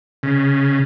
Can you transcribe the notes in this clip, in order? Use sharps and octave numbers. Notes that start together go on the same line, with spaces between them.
C#3